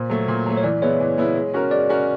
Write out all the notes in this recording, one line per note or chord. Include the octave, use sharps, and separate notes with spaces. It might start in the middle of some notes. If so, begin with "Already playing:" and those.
Already playing: A#2 C5
F#3 A3
A#2
F#3 A3
C#5
E3 D5
G#3 B3 E4 C#5
E3
G#3 B3 E4
G#3
C#4 F#4 A#4
G#3 D5
C#4 F#4 A#4